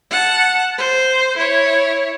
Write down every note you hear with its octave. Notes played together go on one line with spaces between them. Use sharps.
F#5 A5
C5
E4 C#5